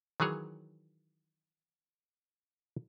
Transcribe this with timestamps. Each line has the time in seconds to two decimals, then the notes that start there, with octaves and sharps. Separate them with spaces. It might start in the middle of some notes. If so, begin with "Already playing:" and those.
0.20 D#3 E3 F#3 G#4 C#5